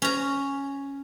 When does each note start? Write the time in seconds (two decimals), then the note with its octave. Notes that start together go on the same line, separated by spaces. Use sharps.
0.02 C#4 A#5